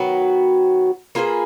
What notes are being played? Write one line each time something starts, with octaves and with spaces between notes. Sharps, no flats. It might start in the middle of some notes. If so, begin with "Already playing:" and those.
Already playing: D#3 F#3 B3 F#4
A#3 F4 G#4 B4